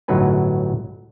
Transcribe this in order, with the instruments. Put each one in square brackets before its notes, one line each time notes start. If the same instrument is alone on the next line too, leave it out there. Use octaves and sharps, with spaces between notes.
[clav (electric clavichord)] G1 A2 F#3 D#4 B4 G#5